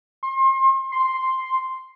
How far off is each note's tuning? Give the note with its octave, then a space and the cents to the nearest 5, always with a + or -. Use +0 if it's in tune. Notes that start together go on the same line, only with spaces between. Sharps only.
C6 +35
C6 +0